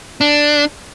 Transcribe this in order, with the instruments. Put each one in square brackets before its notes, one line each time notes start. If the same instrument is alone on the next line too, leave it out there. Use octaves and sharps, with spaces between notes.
[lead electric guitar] D4